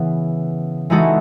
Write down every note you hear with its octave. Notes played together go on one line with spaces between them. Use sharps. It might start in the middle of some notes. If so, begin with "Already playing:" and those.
Already playing: C#3 E3 B3 B4
E3 G#3 D#4 F#4 A4